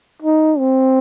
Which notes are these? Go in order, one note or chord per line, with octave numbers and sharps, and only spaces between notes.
D#4
C4